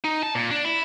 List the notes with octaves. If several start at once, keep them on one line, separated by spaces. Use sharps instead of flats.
D#4
A5
A#2
D4
E4